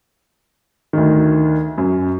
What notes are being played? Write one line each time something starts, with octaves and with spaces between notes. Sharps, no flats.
D2 D#3
F#2